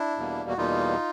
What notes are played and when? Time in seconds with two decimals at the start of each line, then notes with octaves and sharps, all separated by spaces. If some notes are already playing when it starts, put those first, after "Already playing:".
Already playing: D4 E4
0.17 E2 B2 G3 A#3
0.49 F#4
0.57 E2 B2 G3 A#3 D#4 F4